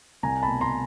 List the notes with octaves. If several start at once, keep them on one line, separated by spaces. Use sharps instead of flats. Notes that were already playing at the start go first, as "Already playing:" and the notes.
C2 G#5 A#5
A5 B5
B2
A#5 C6